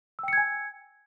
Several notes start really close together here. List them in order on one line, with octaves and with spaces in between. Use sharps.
E6 G5 C#7 G#6 G#5